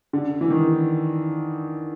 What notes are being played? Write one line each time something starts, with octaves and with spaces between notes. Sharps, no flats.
D3
E3
D#3